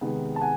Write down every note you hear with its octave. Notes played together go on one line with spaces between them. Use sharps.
C3 D#3 G#3 B3
A5
F#5 G#5